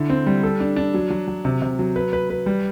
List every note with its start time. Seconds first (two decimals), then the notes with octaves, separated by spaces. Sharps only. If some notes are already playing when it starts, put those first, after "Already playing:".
Already playing: D3 E4
0.10 C4
0.26 G3
0.43 A4
0.60 D4
0.76 D4
0.94 F#3
1.10 F#3
1.28 F#3
1.45 C3
1.62 C3
1.79 F#3
1.96 B4
2.13 B4
2.30 B4
2.46 G3